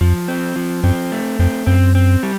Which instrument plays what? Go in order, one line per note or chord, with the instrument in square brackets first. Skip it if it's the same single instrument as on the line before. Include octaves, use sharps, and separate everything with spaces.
[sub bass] F2 [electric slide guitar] F3
[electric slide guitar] C4
F3
[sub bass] F#2 [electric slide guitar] C4
[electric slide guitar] A3
[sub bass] F2 [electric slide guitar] C4
[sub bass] F#2 [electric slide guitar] C4
[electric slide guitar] C4
G3